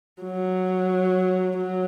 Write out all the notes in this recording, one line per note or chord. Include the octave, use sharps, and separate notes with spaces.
F#3
F#3